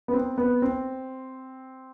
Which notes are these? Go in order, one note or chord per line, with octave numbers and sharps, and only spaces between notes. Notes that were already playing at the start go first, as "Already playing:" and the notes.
B3
C4
B3
C4